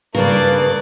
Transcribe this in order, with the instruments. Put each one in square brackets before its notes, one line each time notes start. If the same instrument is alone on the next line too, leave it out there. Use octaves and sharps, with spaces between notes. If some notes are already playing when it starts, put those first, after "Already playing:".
[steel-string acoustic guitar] G2 C#3 [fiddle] A#3 D5 [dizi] B4